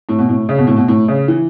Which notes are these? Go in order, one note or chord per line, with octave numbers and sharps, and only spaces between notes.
A2
B2
A2
C#3
B2
A2
B2
A2
C#3
E3